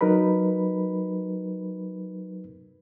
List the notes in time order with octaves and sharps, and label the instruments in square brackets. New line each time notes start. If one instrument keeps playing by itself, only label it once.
[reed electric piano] F#3 D#4 A#4 B4 B5